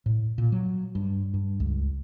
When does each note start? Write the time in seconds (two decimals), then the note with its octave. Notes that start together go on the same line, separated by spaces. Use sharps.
0.06 A2
0.38 A#2
0.52 F#3
0.95 G2
1.34 G2
1.60 C#2